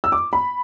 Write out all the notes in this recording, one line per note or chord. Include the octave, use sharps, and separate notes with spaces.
E6
D6
B5